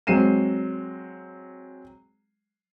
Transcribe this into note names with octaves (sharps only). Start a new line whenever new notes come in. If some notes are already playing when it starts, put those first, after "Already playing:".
F#3 G#3 C4 C7 D#7 E7